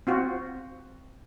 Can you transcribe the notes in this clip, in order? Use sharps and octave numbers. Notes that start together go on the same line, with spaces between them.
C4 F4 F#4